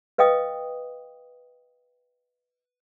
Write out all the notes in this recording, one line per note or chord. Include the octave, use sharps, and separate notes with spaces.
B4 D#5 F5 G5 D#6